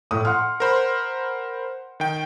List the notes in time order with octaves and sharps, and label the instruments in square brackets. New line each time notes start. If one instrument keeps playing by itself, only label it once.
[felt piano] A2 D#6
F#5 C6 F6
[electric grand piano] A#4 C5 B5
D#3 G5